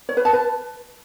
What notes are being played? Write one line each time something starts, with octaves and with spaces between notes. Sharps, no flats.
C#5
B4
A5
B4